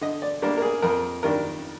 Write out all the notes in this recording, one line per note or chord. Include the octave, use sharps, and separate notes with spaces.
D3 D#5
D5
G3 A#3 D4 A#4
A#4
G#4
F2 A#4
D#3 G3 D4 A#4